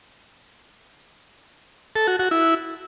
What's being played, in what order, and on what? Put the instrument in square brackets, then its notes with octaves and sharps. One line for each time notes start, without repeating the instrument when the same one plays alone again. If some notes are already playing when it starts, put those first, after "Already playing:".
[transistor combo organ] A4
F#4
F#4
E4